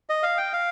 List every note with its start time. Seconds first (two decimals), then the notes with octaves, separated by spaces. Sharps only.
0.09 D#5
0.23 F5
0.38 G5
0.53 F5